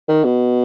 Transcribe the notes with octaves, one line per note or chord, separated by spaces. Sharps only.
D#3
B2